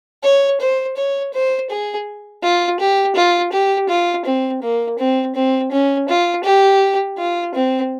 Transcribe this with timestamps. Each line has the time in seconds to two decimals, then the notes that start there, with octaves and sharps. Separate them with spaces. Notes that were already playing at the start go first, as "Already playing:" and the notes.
0.24 C#5
0.60 C5
0.97 C#5
1.34 C5
1.70 G#4
2.43 F4
2.80 G4
3.16 F4
3.52 G4
3.89 F4
4.25 C4
4.62 A#3
4.99 C4
5.35 C4
5.72 C#4
6.09 F4
6.44 G4
7.18 F4
7.55 C4